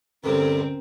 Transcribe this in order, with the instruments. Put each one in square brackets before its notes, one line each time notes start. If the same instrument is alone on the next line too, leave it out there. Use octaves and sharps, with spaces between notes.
[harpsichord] D2 G2 C3 [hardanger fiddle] C4 A#4 [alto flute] C#4 [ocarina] A4